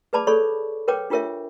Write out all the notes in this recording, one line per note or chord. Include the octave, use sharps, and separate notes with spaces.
G#4 B4 D5 A5 B5 D6
G#4 A4 C#5 D5 B5 C#6
A#4 B4 C#5 G5 D6
D4 F4 G4 A#4 C#5 E5